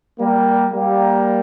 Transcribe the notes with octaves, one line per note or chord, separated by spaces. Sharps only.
G3 A#3
G3 A#3